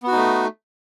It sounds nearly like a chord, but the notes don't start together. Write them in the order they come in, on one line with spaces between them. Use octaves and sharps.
B3 F#4 D#4 A3